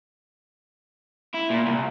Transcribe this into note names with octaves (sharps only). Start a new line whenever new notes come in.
E4
A#2
C2